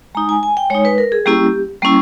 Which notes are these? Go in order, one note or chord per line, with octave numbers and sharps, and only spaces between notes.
G#3 D#4 A#5
G#5
G#5
G5
G#3 D#4 C#5
B4
A#4
G#4
G3 A#3 C#4 E4 G4
G3 A#3 C#4 E4